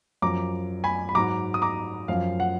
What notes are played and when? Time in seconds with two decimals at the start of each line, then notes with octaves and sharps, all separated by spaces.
0.22 F#2 F3 A#5 D6
0.84 G#5 B5
1.09 B5
1.15 G#2 F#3 A#5 D6
1.54 D#6
1.62 A#5 D6
2.08 F#2 F3 F5
2.40 F#5